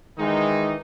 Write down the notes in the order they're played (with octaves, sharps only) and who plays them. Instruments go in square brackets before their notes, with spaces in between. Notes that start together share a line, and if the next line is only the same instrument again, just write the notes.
[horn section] D#3 E3 G#3 D#4